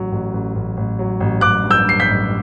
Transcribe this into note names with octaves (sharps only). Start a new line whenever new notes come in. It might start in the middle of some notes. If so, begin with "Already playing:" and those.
Already playing: A1 F#3
A1
A1
A1
A1
F#3
A1
A1 D6 F#6
G2
E6 G6
G2 C7
G6 B6
A1